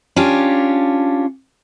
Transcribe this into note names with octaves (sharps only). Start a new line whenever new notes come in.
C#4 D4 F4 G4